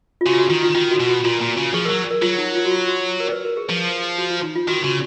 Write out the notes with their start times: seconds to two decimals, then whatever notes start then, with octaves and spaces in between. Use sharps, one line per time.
0.21 F4
0.25 C#3 F#4
0.33 F4
0.38 F#4
0.50 D#3 F4
0.63 F4
0.75 D#3 F4
0.91 F#4
1.00 B2
1.07 F#4
1.24 A#2 F4
1.41 A#2
1.57 C#3
1.73 F3 G#4
1.85 A#4
1.89 F#3
2.11 A#4
2.22 F#3 F4
2.38 D#4
2.55 F4
2.65 F#4
2.72 F4
2.88 F#4
3.20 A#4
3.32 B4
3.45 A#4
3.57 G#4
3.70 F3
4.18 F#4
4.30 F4
4.43 D#4
4.56 F4
4.68 D#3 F#4
4.84 C#3 F#4